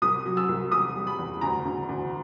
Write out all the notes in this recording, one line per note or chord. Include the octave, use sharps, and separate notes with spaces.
C2 D#6
F#3
E6
C2
E1 D#6
G3
B5
E2
D2 A#5
D2
D2